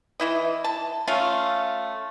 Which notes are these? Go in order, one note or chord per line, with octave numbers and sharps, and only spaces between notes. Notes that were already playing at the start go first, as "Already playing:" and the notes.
E3 E4 D#5
A5
A3 C#4 F4 F5